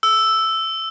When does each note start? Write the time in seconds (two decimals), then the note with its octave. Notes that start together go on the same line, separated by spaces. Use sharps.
0.03 E6